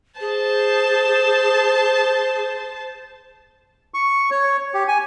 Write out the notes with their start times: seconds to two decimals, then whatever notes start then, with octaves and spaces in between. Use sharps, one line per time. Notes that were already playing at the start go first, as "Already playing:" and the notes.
0.20 G#4 C5 A5
3.94 C#6
4.31 C#5
4.74 G4
4.88 G#5